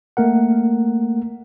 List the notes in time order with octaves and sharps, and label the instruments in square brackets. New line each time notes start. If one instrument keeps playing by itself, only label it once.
[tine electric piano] A3 A#3 A#4 F#5